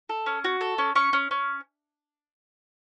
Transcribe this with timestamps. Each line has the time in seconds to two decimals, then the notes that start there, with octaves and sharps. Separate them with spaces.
0.09 A4
0.26 C#4
0.44 F#4
0.61 A4
0.78 C#4
0.95 C#4 C#6
1.13 C#4
1.31 C#4